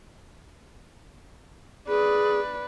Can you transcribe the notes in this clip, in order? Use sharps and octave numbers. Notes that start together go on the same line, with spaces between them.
G#4 B4 D5